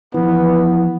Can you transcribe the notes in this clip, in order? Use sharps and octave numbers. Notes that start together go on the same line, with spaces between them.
E3 F3 B3